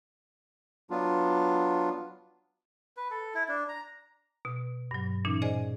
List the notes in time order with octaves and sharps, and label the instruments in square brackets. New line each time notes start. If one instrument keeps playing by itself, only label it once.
[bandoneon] F#3 B3 D4 F4
[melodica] B4
A4
E4
D4
A#5
[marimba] B2
G2 F#3
A#2 E3 C#4 D#4
G#4 C5 D5 D#5 G#5